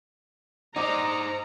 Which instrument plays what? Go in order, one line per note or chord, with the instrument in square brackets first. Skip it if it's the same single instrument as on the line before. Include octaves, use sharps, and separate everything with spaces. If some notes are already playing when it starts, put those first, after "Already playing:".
[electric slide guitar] D#4 C5 [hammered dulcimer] D#5 [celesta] F#5 D6 [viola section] A#5